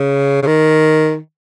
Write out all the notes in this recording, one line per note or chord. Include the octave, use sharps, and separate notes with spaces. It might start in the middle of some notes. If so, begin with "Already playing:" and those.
Already playing: C#3
C#3
D#3